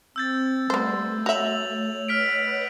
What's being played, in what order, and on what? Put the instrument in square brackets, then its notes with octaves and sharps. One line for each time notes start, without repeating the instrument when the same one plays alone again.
[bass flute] C4 [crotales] E6 G6 A6
[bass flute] G3 [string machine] A3 [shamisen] B3 C5
[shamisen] F#4 E5 [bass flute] C#5 [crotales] F7 F#7
[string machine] B4 D#5 F#5 [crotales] F6 B6 D7